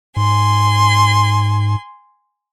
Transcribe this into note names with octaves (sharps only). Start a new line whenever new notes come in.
G#2 G#5 C6